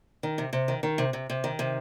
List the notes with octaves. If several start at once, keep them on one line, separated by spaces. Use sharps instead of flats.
D#3
C3
C3
D#3
D#3
C3
C3
C3
D#3
C3